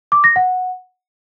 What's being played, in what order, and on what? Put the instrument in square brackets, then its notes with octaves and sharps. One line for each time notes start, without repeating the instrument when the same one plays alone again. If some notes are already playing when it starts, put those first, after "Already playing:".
[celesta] D6
A#6
F#5